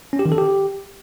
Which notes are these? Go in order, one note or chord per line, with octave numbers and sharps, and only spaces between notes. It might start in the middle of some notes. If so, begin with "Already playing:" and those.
C#4
G4
D#3
A4
G4